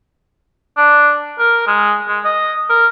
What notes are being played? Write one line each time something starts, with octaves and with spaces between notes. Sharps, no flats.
D4
A#4
G#3
G#3
D#5
A#4